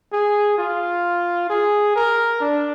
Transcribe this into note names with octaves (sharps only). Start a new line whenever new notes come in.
G#4
F4
G#4
A#4
D4